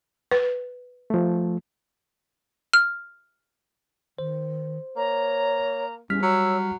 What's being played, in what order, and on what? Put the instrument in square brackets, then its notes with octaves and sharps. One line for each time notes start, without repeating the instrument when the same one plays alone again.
[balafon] B4
[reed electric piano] F3 A3
[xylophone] F6
[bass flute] D#3 [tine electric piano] C5
[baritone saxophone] A#3 [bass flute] C#5 [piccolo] A#5
[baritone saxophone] E2 [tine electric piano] G3 F6 B6 [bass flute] C#4
[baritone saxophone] F#3 [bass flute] C#5 [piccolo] E6